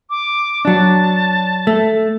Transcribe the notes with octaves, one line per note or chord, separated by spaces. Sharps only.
D6
F#3 D4 A5
A3